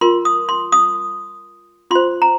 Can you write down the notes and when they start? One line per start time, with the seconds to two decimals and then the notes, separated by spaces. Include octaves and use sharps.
0.01 F4 A#4 C6
0.25 D#6
0.49 C6
0.72 D#6
1.91 F4 C6
1.95 C5
2.22 A#5